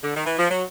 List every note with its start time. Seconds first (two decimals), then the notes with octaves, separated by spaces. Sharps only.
0.03 D3
0.15 D#3
0.26 E3
0.38 F3
0.50 F#3